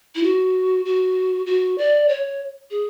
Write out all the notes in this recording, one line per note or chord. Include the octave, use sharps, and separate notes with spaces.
E4
F#4
F#4
F#4
D5
C#5
G#4